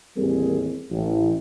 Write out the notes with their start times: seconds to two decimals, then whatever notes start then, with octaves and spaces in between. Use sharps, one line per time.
0.17 A1 D#2 G3 C4 G#4 A#4
0.91 A1